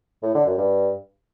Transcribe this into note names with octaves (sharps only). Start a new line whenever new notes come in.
A2
D3
F#2
G2